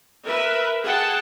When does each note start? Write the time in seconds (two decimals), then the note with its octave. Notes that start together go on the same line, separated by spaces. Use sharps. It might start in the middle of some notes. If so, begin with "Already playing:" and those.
0.24 A#4 B4 E5
0.83 G#4 F#5 G5 A5